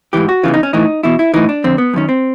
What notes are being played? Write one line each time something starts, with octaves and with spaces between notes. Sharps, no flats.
G#2 E3 G4
F#4
E2 C#3 E3 F4
D#4
C#4
A2 E3 D#4
E2 B2 E4
E4
A2 E3 D#4
D4
F2 D3 C4
B3
F#2 D#3 C#4
C4